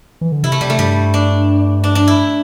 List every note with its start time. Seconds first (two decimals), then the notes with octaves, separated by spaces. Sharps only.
0.21 E3
0.32 D3
0.44 C3 E4
0.52 A3
0.61 C3 G3
0.70 A3
0.79 G2 G3
1.14 D4
1.84 D4
1.95 D4
2.08 E4